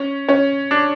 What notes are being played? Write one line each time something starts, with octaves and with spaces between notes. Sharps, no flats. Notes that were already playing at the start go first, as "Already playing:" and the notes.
Already playing: C#4
C#4
D4